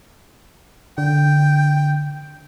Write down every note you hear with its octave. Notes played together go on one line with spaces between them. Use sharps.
D3 G5